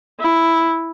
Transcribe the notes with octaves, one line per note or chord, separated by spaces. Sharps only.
E4